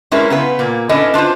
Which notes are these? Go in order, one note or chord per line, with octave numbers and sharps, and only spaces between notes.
G3 G#3 C#4 E4 A#4 B4
C#3 B3 B4
A#2 A#3
C#4 D4 E4 A4 B4 D#5
D4 F4 B4 C5